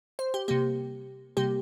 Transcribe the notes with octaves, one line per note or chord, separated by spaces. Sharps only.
C5
G4
C3 G3 A#3 G4
C3 G3 A#3 G4